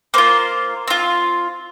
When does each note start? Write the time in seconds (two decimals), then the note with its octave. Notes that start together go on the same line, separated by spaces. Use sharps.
0.14 A#3 F4 C5
0.88 C4 F4